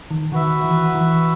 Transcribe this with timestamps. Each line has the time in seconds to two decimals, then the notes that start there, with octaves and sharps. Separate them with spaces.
0.11 D#3
0.32 D#3 F#4 B4 E5
0.64 E3
0.95 E3